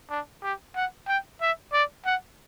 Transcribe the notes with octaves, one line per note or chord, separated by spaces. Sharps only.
D4
G4
F#5
G5
E5
D5
F#5